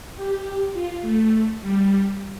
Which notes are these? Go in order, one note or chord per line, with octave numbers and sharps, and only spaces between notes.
G4
F4
A3
G3